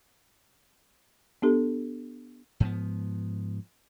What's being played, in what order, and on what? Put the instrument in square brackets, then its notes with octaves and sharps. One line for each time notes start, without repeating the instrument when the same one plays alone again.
[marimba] B3 D4 G4 A4
[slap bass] G#2 F3 B3